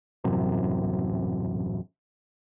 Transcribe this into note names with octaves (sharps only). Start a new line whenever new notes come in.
D#1 A1 F#2 C3